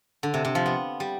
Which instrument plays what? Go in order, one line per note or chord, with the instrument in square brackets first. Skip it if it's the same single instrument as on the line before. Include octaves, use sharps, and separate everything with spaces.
[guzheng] D3
C3
C3
F3
B3
G3